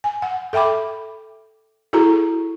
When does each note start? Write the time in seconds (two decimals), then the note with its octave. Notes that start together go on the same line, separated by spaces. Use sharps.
0.04 G#5
0.22 F#5
0.53 A4 E5 G5 B5 D6
1.93 E4 F#4 G#4 A4 A#5